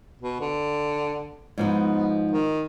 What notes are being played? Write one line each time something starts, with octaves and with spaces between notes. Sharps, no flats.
B2
D3
G#2 F3 B3 D#4
D#3